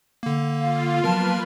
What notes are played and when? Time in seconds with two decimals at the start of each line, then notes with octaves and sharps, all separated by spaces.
0.23 D3 A#3
0.60 F4 F5
1.04 F3 F#3 A#3 B3 A#4 B4 A5 F6